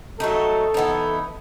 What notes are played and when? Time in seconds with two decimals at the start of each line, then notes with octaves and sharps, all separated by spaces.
0.20 F#3 A3 D#4 A4
0.74 E3 B3 D#4